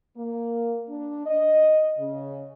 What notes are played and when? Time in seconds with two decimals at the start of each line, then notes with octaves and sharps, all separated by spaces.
0.17 A#3
0.89 D4
1.26 D#5
1.99 C#3